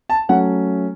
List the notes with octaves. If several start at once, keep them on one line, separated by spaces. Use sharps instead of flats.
A5
F#3 A3 C#4 F#5